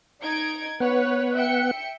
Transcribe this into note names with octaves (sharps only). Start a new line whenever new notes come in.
D#4 G#6 D7
B3 B4 C#5 F#5
E5 G5 C#7